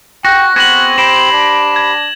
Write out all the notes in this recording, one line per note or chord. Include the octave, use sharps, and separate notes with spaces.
F#4 G5 F#6 A#6
B3 C4 F#4 G#4 G#6 A#6 F#7
G4 C5 G5 B5 E7
D4
G#6